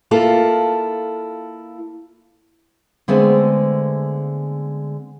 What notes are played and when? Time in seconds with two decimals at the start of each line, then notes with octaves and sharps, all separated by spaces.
0.11 A#3 E4 F4 A4
3.08 D3 G#3 A3 B3 C4